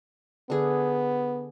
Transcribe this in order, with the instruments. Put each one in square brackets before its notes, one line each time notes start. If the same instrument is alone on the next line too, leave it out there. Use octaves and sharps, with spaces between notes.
[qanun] D3 G#4 [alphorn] B3